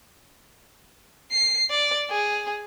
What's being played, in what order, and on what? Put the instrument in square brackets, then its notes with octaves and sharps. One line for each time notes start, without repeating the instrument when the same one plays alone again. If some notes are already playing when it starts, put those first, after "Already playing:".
[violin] C7
D5
G#4